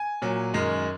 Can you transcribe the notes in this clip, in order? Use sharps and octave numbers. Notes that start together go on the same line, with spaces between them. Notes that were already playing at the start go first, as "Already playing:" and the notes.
Already playing: G#5
A#2 F#3
F#2 D#3 G#3